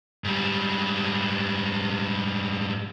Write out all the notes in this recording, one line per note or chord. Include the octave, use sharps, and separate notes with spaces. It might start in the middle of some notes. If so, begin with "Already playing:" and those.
G#2 G3